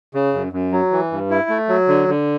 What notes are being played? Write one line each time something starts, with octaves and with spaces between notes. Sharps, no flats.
C#3
F#2
F#2
F#3
E3
G2
E4
A3
F#3
D3
D3